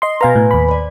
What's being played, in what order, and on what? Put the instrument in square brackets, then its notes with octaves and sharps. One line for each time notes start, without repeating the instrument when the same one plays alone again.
[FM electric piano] D#5 C6
[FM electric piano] B2 F5 A#5 [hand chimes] B4 G#5
[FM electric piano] A2
D#2 B5
[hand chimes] C5 D5